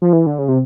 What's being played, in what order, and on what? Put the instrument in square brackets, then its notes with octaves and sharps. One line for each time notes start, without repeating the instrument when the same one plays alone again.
[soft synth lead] F3
E3
D3
C#3
C3